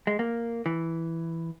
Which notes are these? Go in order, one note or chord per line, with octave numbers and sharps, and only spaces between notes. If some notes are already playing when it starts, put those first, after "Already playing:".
G#3
A#3
E3